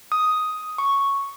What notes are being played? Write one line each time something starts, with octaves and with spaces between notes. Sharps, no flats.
D#6
C#6